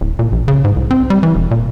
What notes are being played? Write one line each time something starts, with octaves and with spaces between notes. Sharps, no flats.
D1
A#2
A#1
C#3
G#2
C2
C4
G3
E3
E1
A#2